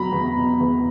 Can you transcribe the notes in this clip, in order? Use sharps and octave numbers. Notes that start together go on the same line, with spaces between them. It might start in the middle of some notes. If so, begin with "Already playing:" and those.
Already playing: E2 B2 F#3 A#5 B5
E2
B2
E2